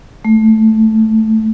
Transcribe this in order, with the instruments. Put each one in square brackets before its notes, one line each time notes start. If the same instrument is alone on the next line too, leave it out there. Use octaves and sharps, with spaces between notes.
[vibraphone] A3